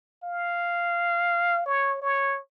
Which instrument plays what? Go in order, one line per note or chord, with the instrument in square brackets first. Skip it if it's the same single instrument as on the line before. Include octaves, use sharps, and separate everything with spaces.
[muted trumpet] F5
C#5
C#5